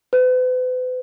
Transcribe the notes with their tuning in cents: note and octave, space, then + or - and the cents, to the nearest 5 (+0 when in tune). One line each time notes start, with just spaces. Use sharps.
B4 +40